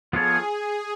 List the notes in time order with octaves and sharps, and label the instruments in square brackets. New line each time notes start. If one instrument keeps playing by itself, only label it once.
[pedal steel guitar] F3 B3 F4 A4 C#5 [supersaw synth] G#4